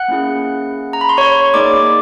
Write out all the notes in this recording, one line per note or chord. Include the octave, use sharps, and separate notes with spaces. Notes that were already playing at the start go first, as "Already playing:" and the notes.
Already playing: F#5 F#6
A#3 C#4 E4 G#4
A#5
B5
C6
C#5 C#6
A#3 D#4 G#4 D5 D6